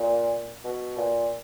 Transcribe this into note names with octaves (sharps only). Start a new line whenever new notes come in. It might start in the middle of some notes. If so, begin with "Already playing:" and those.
Already playing: A#2
B2
A#2